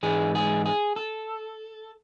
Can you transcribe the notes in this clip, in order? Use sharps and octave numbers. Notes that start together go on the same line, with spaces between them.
G#2 E3 G#3 G#4
G#4
G#4
A4